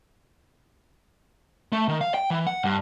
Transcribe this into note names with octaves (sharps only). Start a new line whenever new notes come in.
A3
D#3
F5
G5
E3
F#5
G2